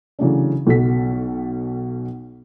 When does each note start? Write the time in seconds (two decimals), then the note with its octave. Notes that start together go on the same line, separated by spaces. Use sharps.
0.19 C#3 E3 F#3 A3 C#4 D4
0.67 B1 B2 A4 B6